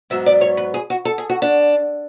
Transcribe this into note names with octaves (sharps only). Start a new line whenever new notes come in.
G#2 F#3 B3 E5
D5
C#5
B4
G#4
F#4
A4
G#4
F#4
D4